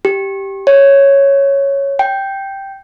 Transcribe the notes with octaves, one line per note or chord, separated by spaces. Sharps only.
G4
C#5
G5